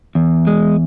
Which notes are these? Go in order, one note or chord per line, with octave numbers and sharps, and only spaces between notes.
E2
G#3